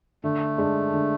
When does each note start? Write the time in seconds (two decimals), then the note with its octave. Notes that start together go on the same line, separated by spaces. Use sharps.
0.24 D3 A3
0.58 G#3 D4
0.94 D3